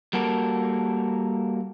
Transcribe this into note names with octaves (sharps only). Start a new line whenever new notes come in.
G3 A#3 F#4 A4 A#4